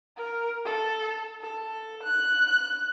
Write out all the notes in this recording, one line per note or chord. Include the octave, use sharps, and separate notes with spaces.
A#4
A4
A4
F#6